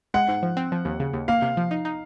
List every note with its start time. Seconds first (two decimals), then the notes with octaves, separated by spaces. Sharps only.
0.14 G#3 F#5
0.28 G#2
0.43 F3
0.57 C4
0.72 F3
0.85 D#2
1.00 C#3
1.13 D#2
1.28 A#3 F5
1.42 C3
1.57 F3
1.71 D#4
1.85 D#4